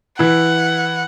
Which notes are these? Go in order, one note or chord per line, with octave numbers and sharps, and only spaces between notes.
E3 E4 F#5